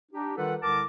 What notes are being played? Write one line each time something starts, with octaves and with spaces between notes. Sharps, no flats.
D4 D#4 G4
D#3 G3 F4 A4 B4 F#5
C2 D3 A#4 A5 D6